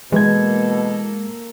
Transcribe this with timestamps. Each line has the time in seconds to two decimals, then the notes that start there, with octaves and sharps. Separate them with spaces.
0.12 B2 E3 G#3 A#3 A4 G#6